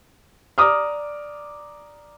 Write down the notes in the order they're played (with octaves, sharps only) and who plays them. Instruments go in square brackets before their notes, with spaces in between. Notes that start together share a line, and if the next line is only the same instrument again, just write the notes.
[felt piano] D5 A#5 D6 D#6 F6